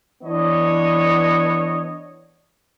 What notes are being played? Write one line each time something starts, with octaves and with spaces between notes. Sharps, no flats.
E3 B3 D4 C#5 D#5